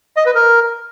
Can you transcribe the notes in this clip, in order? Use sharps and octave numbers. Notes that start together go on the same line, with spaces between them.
D#5
B4
A#4